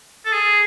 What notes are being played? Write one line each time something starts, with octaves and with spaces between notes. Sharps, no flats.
A4
G#4